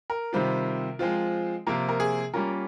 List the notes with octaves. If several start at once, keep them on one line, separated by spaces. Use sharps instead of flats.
A#4
C3 D#3 G3 C4 F4
F3 G#3 C4 F4
C3 F3 A#3 F4 A#4
A#4
G#4
G3 A#3 C#4 F4 A#4